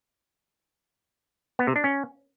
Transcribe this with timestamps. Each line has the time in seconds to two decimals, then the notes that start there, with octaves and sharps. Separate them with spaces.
1.59 B3
1.67 C3
1.76 D4
1.84 C#4